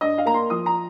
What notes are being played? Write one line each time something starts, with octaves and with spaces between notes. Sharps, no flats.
G2 D#5
F5
A#3 A#5
C6
F3 D#6
A#5